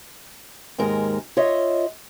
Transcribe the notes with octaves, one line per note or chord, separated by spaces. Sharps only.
D#2 G#2 G#3 A#4
F4 C#5 D#5 E5